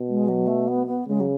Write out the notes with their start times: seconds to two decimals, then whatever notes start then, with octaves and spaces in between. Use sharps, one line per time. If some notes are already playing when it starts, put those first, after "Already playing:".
Already playing: B2
0.09 G#3
0.28 F#3
0.47 A3
0.67 B3
0.86 B3
1.07 C#3 G#3
1.20 F#3